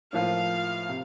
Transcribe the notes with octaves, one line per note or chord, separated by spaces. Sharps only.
A2 F3 A#3 F4 F5
C3